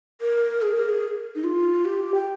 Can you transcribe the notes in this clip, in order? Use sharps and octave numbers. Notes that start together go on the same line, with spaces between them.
A#4
G#4
A#4
G#4
D#4
F4
G4
G5